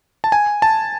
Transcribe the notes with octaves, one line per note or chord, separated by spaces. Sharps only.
A5
G#5
A5